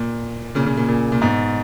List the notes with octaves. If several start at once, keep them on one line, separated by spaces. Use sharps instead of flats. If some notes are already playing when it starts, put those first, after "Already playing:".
Already playing: A#2
A#2 C#3
A#2 C#3
A#2
A#2
A#2
G#2 B2